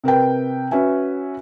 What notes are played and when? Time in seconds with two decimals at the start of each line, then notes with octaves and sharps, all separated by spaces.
0.04 C3 A#4 B4 G5
0.71 C#4 F#4 B4 E5 G#5